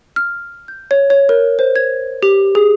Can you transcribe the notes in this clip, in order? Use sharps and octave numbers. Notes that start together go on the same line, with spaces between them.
F6
G6
C#5
C#5
A#4
C5
G#6
G4
G#4